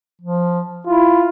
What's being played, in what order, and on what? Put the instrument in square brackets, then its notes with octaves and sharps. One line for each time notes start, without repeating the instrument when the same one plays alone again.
[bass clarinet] F3
[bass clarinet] E4 [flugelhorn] F4